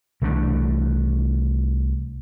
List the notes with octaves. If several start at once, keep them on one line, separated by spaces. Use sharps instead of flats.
C2 E3 A3 D4